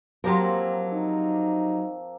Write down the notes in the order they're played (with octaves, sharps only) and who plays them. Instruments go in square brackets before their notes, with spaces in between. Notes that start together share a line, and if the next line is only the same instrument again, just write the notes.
[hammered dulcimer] F3 A#3 C4 [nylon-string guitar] F#3 G4 A#4
[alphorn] D#4